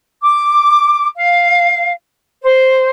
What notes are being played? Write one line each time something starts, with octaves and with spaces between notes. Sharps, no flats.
D6
F5
C5